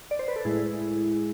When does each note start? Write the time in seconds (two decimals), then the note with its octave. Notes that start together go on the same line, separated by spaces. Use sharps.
0.11 D5
0.19 C5
0.28 B4
0.36 A4
0.45 A2 G#3 E4 G#4